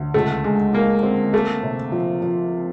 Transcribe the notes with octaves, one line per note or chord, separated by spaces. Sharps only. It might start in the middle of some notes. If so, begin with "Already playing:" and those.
Already playing: D2
C#2 A3
G#3
G#3 A#3
C4
A3 A#3
C3
F3
F3